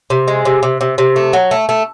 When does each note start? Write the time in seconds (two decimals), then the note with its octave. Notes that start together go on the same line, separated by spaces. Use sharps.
0.10 C3
0.28 G#3
0.45 C3
0.63 C3
0.81 C3
0.98 C3
1.16 A3
1.33 F#3
1.51 A3
1.69 A3